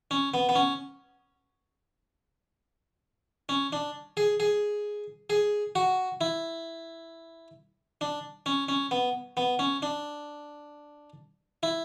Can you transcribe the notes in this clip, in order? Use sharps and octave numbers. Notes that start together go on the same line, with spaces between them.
C#4
B3
B3
C#4
C#4
D4
G#4
G#4
G#4
F#4
E4
D4
C#4
C#4
B3
B3
C#4
D4
E4